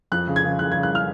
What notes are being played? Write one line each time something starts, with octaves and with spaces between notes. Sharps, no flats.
F2 F#6
C#3
G#6
C#3
C#3 F#6
G#6
C#3
F#6
F6